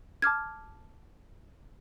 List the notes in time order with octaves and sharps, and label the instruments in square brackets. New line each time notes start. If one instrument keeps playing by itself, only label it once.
[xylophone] A5 D6 F6 G#6